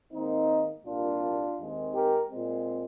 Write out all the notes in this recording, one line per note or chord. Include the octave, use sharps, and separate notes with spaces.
G#2 D#3 A#3 C4 D#4
C2 A#2 G3 A#3 D4 F4
D#2 D#3 G#3 C4
G4 A#4
A#2 G#3 C4